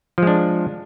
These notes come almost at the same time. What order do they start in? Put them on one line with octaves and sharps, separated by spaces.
F3 G#3 D4